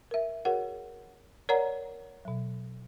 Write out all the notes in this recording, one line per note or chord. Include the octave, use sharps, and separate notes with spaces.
A#4 E5
F#4 G#4 A#4 C#5 F#5
A#4 C#5 D5 F#5 A#5
B2 F#3